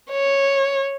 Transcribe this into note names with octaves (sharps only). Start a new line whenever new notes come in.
C#5